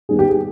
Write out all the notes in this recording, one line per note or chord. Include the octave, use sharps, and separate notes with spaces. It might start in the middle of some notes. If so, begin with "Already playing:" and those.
D#3 G3 B3 G#4
G4
G#4